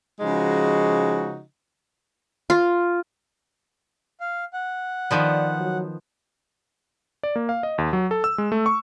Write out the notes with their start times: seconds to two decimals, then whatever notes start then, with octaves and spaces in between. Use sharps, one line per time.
0.20 C#3 F3 G#3 D#4 F#4
2.50 F4
4.20 F5
4.53 F#5
5.11 D#3 F3 B3 D5
5.59 F#3
7.23 D5
7.36 A#3
7.49 F5
7.63 D#5
7.78 D#2
7.93 F#3
8.11 A4
8.24 E6
8.38 G#3
8.52 A3
8.66 C#6